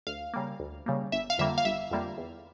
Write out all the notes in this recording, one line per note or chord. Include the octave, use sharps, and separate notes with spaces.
D2 F5
C#3 G3 A#3
D2
C#3 G3 A#3
G1 E5
F5
F2 D3 G3 A#3 E5
F5
G1 E5
F2 D3 G3 A#3
E2